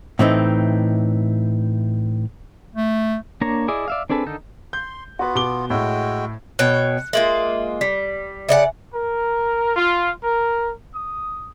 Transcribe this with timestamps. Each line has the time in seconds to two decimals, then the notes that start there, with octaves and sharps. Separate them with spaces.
0.19 A2 E3 C4 D#4
2.75 A3
3.41 A#3 D4 C#5 A#5
3.68 E4 G#4 D5 D#5
3.88 D5 E5 F5
4.10 C4 D4 G#4 A4 B4
4.26 D3 D#3 D#4 A4 G6
4.73 C6 G6
5.19 B3 F4 F#4 B4
5.35 B2 D6 G7
5.70 A2 G#3 F#4 G5
6.59 B2 C#5 G5 F#6
7.13 G#3 A#3 F4 D#5 E5 F#7
7.81 G3 B6
8.49 C#3 D5 E5 F#5 G#5
8.94 A#4
9.77 F4
10.23 A#4
10.93 D#6